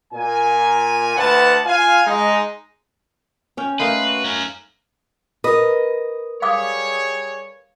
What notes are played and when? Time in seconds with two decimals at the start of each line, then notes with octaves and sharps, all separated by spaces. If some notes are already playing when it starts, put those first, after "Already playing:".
0.14 A#2 G#5
1.16 D2 B4 F#5 A5
1.65 F4 F5 G#5
2.06 G#3 D#4
3.57 C#4 G5
3.80 A3 A#3 D#4 B4 C6
4.05 F#4
4.24 C#4 A#4
5.44 A#4 B4 D#5
6.42 G3 G#4 C#5 F5 D6 D#6